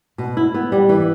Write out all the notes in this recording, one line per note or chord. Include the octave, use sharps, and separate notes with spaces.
B2
E4
B3
G3
E3